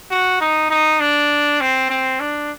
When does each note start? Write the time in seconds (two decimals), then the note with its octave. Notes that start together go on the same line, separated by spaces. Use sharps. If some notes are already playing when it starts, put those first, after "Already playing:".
0.11 F#4
0.41 D#4
0.70 D#4
1.00 D4
1.61 C4
1.90 C4
2.20 D4